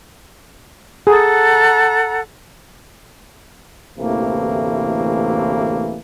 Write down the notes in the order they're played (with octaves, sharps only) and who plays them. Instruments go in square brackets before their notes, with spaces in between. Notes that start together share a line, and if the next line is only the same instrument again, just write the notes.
[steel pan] G#4 [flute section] A4 F#5 A#5
[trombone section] A1 D2 C3 E3 A3 A#3